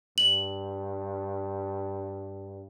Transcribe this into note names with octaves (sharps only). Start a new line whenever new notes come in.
G2 F#7